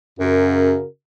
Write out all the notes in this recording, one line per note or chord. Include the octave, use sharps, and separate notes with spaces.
F#2 C#3 F#4 A#4